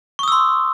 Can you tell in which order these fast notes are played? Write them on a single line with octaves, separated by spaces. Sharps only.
C#6 D#6 E6 C6